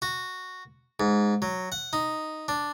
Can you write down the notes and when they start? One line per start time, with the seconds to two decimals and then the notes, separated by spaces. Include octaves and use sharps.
0.02 F#4
1.00 G#2
1.42 F#3
1.72 F#5
1.93 D#4
2.48 D4